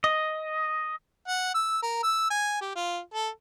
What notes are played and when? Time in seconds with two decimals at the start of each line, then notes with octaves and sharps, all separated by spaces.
0.04 D#5
1.28 F#5
1.54 E6
1.83 A#4
2.03 E6
2.30 G#5
2.61 G4
2.75 F4
3.14 A4